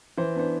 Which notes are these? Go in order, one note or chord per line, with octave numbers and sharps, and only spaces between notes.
E3 C5
B3 D4 C5